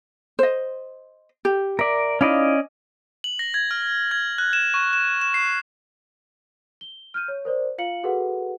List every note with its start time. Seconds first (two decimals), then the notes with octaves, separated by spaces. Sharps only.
0.39 C5 D#5
1.45 G4
1.79 A#4 D5 E5
2.21 C#4 D#4 E4 D5 D#5 F5
3.24 F#7
3.39 A#6
3.54 G#6
3.71 F6
4.11 G#6
4.38 F#6
4.53 E7
4.74 C#6
4.93 E7
5.21 E7
5.34 C7
6.81 G7
7.14 F6 G6 D#7
7.28 C#5
7.45 A#4 C5 D5
7.78 F4 F5 C#7 F#7
8.03 F#4 G#4 A4 B4 F#5